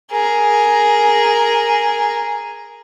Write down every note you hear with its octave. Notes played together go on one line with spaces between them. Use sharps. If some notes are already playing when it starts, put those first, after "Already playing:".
G#4 A#4